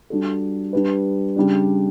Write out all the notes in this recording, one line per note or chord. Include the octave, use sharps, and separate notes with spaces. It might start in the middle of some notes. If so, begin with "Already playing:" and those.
G3 D4 F#4 A4
G3 D4 G4 B4
C#3 G3 D4